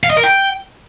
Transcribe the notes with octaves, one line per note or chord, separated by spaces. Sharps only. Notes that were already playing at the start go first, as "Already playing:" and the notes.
F5
D#5
A#4
G5